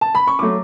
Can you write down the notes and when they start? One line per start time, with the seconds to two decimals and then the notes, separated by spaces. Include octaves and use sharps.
0.01 A5
0.15 B5
0.27 C#6
0.39 F#3 A3 D6